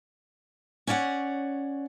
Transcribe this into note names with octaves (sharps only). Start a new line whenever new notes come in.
C#4 C#5 D5 E5 F#5